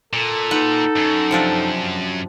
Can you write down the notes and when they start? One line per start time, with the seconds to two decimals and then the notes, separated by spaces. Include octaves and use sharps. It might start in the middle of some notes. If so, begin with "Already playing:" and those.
0.13 A#2 A4
0.51 D#4 B4 F#5
0.96 F#2
1.31 C3 F3 D4